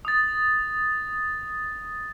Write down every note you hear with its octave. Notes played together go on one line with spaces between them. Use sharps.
D#6 A6